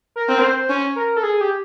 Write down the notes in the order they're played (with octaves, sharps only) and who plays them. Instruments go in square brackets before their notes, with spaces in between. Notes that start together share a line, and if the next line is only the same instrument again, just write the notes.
[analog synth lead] A#4
[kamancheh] C4
[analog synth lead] C5
[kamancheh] C#4
[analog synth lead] A#4
A4
G#4
G4